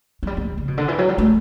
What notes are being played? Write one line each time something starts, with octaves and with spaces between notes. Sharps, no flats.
F#3
G3
B3
C#3
C#3
B2
D3
E3
F#3
G3
A3